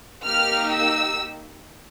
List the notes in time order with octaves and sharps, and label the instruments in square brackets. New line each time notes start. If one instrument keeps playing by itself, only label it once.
[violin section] A#3 D#4 G4 F6
E6